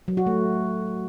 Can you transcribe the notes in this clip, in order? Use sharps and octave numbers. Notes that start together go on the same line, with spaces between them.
F#3
F#4
A3